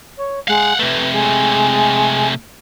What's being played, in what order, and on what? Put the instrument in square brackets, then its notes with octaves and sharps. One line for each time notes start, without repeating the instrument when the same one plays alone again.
[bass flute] C#5
[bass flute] G#3 [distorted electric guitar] F5 F#5
[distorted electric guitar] C3 A3 [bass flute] B4
[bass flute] G#3